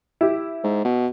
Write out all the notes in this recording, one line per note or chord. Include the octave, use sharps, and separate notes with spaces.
E4 G4
G#2
B2